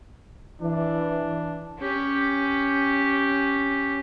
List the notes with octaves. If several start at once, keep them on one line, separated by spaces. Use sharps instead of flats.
E3 D4
C#4 G4